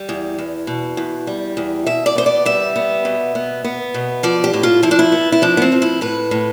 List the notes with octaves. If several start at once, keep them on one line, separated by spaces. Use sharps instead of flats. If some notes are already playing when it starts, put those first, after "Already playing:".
Already playing: G3
E2
E2
B2
E2
G3
E2
B2 E5
D5
B3 C5
D5
G3 E5
B3
B2
B3
B3
B2
F3 D5
G4
A2
F4
F3 E4
D4
E4
B3
E4
F3 D4
B3
C4
F3
E4
A2 B4
A2